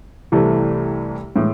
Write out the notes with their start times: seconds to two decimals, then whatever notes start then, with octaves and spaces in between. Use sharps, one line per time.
0.32 C2 C3 E3 A3
1.36 A2 E3 G#3